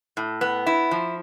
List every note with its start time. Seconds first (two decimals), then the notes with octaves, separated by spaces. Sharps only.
0.17 A2
0.41 B3
0.66 E4
0.91 F3